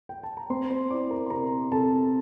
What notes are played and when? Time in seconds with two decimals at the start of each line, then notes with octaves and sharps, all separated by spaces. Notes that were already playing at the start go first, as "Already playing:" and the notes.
0.09 G5
0.23 A5
0.37 A#5
0.50 C4 C5 C6
0.70 C5 C6
0.90 E4 D5 D6
1.10 A#4 A#5
1.26 C6
1.30 C3 A#4 A#5
1.72 C3 A4 A5